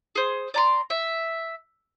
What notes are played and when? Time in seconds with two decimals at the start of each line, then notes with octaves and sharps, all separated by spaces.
0.15 G#4 C5
0.54 D5 A#5 C6
0.90 E5